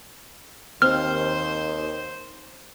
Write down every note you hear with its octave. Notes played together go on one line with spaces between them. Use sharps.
D#2 C4 C5 F6